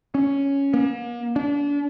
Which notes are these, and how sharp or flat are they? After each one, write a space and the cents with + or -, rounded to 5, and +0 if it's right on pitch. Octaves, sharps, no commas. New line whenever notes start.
C#4 +5
A#3 +40
D4 -35